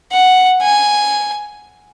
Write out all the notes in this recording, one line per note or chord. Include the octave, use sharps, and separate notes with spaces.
F#5
G#5